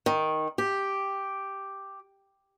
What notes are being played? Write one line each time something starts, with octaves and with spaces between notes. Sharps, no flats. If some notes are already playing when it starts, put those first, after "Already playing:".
D#3
G4